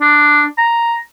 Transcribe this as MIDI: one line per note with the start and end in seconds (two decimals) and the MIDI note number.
0.01 0.45 62
0.58 0.97 82